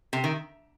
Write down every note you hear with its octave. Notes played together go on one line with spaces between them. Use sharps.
C3
D#3